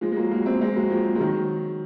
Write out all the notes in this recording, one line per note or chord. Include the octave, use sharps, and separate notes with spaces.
F3 G#3
G#3
F#3 A#3
F#3 A#3
G#3 C4
G#3 C4
F#3 A#3
F3 G#3
G#3
D#3 F#3